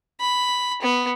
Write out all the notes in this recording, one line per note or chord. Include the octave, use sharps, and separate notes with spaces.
B5
B3